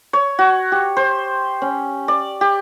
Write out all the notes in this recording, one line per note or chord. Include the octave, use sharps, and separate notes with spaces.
C#5
F#4
G4
C5
C#4
D5
G4